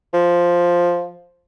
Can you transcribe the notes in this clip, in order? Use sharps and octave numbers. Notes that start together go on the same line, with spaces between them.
F3